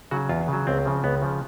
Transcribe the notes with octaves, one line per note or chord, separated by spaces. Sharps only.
C#3 F#3 F#4
E2 F4
C#3 F#3
C#2 C4
C#3 F3
C#2 B3
C#3 F3